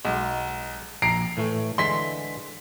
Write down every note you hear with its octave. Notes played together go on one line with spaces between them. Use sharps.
B1 G#3
A#1 A#5 C7 D7
A2 E3 A3
D3 E3 G#3 C6 B6